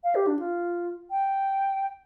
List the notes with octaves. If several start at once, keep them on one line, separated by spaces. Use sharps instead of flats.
F5
G4
D4
F4
G5